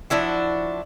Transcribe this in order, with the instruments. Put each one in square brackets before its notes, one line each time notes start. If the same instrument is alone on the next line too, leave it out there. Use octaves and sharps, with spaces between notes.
[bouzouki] F3 D4 E4 F#4